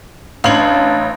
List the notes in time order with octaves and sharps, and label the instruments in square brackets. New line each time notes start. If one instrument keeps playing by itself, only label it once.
[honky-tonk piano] A1 F#7 [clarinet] D4 [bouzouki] C#5 F5